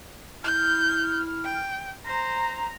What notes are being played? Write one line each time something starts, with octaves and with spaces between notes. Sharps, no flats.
E4 F6 G6
G5
C5 A#5